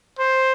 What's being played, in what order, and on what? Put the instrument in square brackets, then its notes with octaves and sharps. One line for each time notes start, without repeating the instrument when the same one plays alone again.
[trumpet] C5